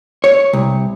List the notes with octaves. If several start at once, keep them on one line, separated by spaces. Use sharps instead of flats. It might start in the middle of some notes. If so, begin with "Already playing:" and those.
C#5
C2